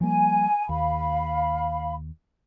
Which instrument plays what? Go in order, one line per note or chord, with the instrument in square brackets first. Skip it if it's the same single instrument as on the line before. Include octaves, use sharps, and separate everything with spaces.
[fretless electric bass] F3 G3 A#3 [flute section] G#5
[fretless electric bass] D#2 [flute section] F5 B5